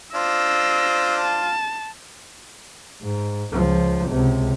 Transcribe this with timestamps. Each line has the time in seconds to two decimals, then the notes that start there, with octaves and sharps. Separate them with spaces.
0.15 D4 F4 C5 E6 A#6
1.20 A5
3.02 G#2
3.52 C#2 F3
4.09 C#2 C3